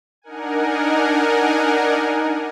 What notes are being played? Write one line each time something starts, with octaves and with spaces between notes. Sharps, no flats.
D4 D#4 A#4 F#5 G#5